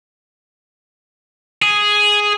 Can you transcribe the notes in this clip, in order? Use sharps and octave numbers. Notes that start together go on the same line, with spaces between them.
G#4